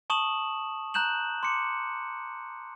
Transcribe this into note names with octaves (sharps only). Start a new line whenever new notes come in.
A5 C#6 D#6 E7 F#7
A#5 F#6 G6 E7 F#7
C6 D6 C#7